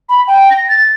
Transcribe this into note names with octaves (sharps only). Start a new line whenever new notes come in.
B5
G5
A#6
A6